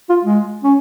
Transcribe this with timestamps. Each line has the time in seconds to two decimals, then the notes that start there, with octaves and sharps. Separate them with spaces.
0.09 F4
0.25 G#3
0.64 C#4